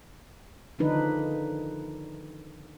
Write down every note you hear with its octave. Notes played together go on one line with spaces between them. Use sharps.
D3 D#3 F3 D4 D#4 B4